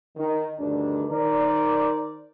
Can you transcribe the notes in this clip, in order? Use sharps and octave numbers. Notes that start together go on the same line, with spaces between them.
D#3
D2 G2 D#3 D4
D#3 A#4 C5 D5